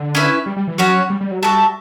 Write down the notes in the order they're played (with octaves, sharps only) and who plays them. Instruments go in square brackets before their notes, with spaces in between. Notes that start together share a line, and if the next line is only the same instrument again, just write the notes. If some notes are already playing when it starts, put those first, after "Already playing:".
Already playing: [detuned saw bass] D3
[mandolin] C#4 E4 B4
[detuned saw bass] G3
G3
E3
[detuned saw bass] F#3 [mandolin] C#4 F#4 C#5
[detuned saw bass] G3
G3
F#3
[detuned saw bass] G3 [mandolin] F#4 A4 E5 A5